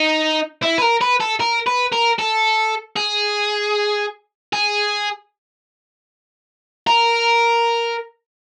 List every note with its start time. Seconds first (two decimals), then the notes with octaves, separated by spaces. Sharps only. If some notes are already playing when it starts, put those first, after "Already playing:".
Already playing: D#4
0.63 E4
0.78 B4
0.82 A#4
1.01 B4
1.21 A4
1.40 A#4
1.67 B4
1.92 A#4
2.19 A4
2.97 G#4
4.53 G#4
6.87 A#4